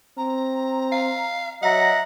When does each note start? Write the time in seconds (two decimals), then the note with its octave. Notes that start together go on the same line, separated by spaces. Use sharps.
0.17 C4 A#5
0.92 F5
1.63 F#3 D#5 E5 F#5 A#5